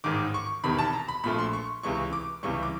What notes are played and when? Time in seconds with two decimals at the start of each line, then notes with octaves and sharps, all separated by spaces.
0.04 A1 G#2 D#3 D6
0.34 C#6
0.64 E1 E2 C3 D#3 B5
0.78 A5
0.93 A#5
1.08 B5
1.23 A#1 A#2 F3 A3 B5
1.39 C6
1.53 C#6
1.83 C#2 C3 E3 G#3 C#6
2.13 D6
2.43 C#2 C3 E3 G3 C#6
2.63 D6